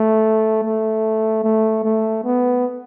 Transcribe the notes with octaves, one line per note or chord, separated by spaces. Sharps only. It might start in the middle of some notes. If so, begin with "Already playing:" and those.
Already playing: A3
A3
A3
A3
B3